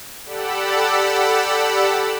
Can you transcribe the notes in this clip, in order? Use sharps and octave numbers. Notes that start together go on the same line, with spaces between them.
G4 A4 D5 F#5 B5 E6